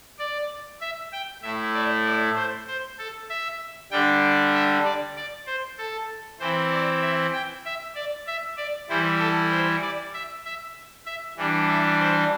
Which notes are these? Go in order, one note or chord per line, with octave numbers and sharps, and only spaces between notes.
D5
E5
G5
A2 A3 E4 E5
D5
D5
C5
C5
A4
E5
D3 G3 D4 G5
E5
D5
D5
C5
A4
E3 C4 E4 C5
D5
E5
G5
E5
D5
E5
D5
E3 G3 E4 C5
A4
C5
D5
E5
E5
E5
E3 G3 D4
E5
C5